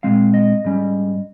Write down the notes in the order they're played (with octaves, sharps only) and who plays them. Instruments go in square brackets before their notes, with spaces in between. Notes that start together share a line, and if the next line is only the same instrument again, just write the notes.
[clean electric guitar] A#2 G#3 C4 F5
D#5
G#2 G3 C#4